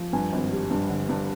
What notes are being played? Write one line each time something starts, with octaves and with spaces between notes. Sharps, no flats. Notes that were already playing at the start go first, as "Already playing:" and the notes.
Already playing: F3
G2 G#5
G#1
G3
G2
D3
G2